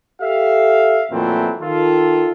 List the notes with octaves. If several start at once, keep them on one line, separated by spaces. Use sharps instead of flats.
G4 A4 E5 F5
F2 A#2 E3 F#3 A3 C4
D#3 F4 A4